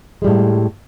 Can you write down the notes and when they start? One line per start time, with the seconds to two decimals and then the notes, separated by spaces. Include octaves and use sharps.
0.22 G#3
0.24 G3
0.27 A2